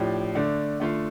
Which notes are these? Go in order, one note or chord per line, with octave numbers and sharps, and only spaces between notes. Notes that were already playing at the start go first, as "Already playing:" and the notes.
Already playing: A2 F3 D4 G4
D3 A3 D4
D3 A3 F4